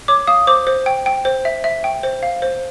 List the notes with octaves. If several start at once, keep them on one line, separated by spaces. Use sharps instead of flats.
C#5 D6
F5 D#6
C5 D6
C5
G5
G5
C5
E5
E5
G5
C5
F5
C5